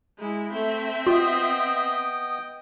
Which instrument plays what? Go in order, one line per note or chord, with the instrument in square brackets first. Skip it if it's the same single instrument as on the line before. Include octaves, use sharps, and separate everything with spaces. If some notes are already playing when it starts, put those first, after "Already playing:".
[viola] G#3 E4
[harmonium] A3 [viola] C4 E5
[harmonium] B3 D#5 G5 [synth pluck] F4